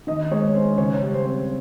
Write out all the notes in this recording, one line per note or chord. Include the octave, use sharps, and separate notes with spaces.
D#3 D#5
G#3 C#5
C#4 C5
C#3 C#5
G3
C5
C4